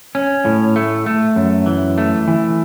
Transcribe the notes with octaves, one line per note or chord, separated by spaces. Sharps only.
C#4
A2
A3
A3
F#2
E3
A3
E3